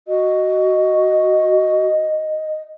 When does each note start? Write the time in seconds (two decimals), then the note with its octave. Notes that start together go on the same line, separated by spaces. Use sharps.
0.08 F#4 D#5